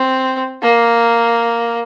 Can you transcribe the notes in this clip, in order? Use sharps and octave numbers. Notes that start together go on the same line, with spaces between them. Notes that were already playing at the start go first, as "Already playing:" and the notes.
Already playing: C4
A#3